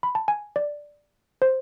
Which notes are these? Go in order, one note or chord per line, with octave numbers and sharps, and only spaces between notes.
B5
A5
G#5
D5
C5